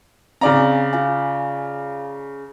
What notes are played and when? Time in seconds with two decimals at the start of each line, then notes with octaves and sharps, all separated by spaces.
0.41 C#3 C4 D5 F5 G#5 A#5
0.93 F4 F5 G#5